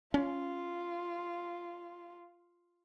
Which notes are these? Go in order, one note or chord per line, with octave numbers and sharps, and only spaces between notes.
C#4 F4